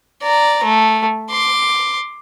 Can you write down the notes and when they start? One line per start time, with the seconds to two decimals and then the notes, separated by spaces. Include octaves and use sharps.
0.22 D5 A#5
0.63 A3
1.31 C6 D6